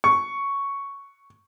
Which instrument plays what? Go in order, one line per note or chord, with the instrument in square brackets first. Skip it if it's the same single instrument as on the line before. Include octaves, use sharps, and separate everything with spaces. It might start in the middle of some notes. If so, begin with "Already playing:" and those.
[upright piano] C#6